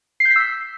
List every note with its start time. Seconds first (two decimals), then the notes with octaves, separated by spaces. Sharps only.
0.20 C7
0.25 G6
0.31 B6
0.36 E6